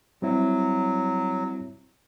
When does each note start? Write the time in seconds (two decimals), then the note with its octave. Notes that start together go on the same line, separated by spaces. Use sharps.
0.22 F#3 G3 C4 E4